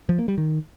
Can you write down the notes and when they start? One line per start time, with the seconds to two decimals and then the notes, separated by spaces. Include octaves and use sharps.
0.09 F3
0.19 A#3
0.28 G3
0.38 D#3